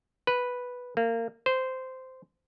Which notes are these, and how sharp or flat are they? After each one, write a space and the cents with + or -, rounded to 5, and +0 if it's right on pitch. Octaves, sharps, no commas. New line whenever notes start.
B4 -5
A#3 -25
C5 -10